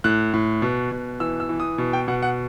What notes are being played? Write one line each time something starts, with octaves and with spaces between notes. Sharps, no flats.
A2 F#6
A2
B2
B2
E3 E6
E6
E3
D#6
B2
G5
B2 F#5
F#5